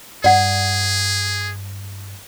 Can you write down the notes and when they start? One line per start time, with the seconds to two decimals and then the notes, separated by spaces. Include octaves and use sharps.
0.24 G2 G#4 D5 F#5